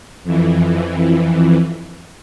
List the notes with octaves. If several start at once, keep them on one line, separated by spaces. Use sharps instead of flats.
F2 E3